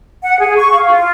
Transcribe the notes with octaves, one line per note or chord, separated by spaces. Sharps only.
F#5
G#4
C#6
F5
F4